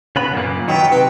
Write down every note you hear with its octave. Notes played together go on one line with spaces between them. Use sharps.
C#3 B3 B5
F#2 A#2 A#3
D#3 F#3 B3 G5
C3 B4